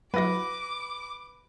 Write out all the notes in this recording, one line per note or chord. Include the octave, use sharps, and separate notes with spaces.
F#3 E4 F#4 B4 D6 A#6